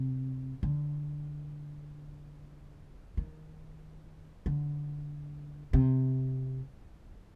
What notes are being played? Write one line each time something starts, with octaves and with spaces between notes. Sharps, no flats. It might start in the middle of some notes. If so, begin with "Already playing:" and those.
Already playing: C3
D3
D#3
D3
C3